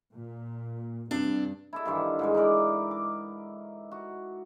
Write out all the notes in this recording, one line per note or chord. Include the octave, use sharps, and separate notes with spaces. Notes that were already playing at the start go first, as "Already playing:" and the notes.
A#2
G2 C3 D4
E4 A4 E5
G2 D#3 E3 F4
G#2 E3 G#3
D#4 E4 A#4 D5
D6
F#4